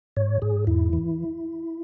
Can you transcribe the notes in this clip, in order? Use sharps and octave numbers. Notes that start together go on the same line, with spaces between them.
G#2 C#5
G#2 G#4
E2 E4
E3